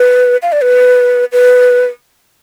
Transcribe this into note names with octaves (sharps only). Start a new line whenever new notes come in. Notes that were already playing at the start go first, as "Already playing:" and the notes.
Already playing: B4
F5
D5
B4
B4